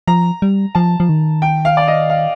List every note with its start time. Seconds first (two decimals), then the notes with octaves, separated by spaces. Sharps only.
0.07 F3 A#5
0.42 G3
0.75 F3 A5
1.00 F3
1.09 D#3
1.42 G5
1.65 F5
1.77 D5
1.88 D#5
2.09 F5